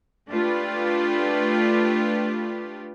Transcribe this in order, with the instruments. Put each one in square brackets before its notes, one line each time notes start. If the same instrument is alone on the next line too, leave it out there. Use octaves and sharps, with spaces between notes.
[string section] A3 D4 F4 G4 B4